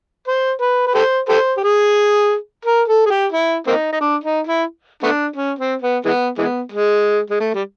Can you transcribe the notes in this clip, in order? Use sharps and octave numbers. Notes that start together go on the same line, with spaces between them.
C5
B4
B4
G4 A4 C5
G4 A4 C5
G4
G#4
A#4
A4
G#4
G4
E4
A#3 C4 D#4
D#4
D4
D#4
E4
A3 B3 D4
C#4
C4
B3
E3 G#3 B3
E3 G#3 B3
G#3
G#3
A3
G3